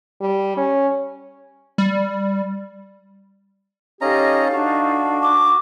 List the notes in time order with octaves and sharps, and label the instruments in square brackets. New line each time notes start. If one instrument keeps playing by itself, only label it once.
[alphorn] G3
C#4
[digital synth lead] G3
[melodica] C#4 D#5 A#5 [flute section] D#4 A4 F5 [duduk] G4
[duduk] D4 [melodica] F#4
[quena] D6